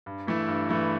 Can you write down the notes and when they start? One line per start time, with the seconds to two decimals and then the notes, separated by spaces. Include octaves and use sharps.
0.06 G2
0.27 E3 A3 E4
0.48 G2
0.69 E3 A3 E4